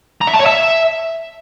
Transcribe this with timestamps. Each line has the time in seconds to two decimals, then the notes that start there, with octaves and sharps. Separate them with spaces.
0.22 A#5
0.28 E5
0.34 A5
0.40 C#5
0.47 E5